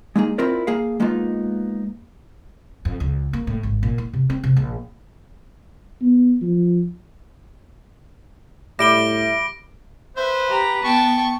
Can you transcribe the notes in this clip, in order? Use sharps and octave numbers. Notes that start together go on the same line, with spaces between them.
G#3 A#3 D#4 G#4
C4 E4 F4 A#4 D5
A#3 G#4 F5
G#3 A#3 B3 D#4 F4
F2
C#2
A#3
A2
G#1
A#2
E4
C3
C4
C3
A#1
B3
F3
A2 G3 E5 A#6 D7 G7
B4 C5 E5
G4 A#5
B3 G5 A5 C#6